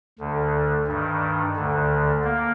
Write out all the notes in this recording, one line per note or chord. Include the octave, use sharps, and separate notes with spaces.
D2 D3
G2 D#3
D2 D3
A#3